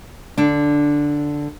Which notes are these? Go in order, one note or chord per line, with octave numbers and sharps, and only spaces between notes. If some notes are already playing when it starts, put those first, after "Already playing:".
D3 D4